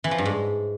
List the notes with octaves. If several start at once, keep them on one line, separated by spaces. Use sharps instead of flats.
E3
F3
G2
G#2